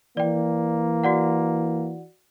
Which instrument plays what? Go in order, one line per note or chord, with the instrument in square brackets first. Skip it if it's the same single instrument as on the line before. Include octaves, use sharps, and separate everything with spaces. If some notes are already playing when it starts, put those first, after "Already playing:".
[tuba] E3 [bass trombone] A#3 [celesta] D5 G5
[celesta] F#4 D5 F#5